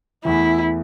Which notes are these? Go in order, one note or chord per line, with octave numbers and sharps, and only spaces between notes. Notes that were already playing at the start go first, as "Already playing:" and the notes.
E2 E3 A3 E4